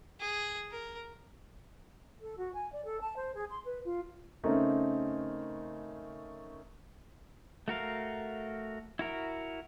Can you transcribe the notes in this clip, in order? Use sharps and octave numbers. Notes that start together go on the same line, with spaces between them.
G#4
A#4
A4
F#4
G#5
D5
A4
A5
C5
G#4
C6
B4
F4
C#3 A3 C4 C#4 D#4 A#4
A3 F#4 A#4 F5
E4 F#4 A#4